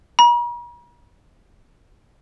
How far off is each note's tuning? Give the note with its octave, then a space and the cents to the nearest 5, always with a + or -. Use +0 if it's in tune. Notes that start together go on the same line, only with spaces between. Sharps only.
A#5 +45